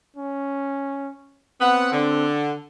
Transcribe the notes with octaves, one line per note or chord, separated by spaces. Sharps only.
C#4
B3 C4 F#5
D3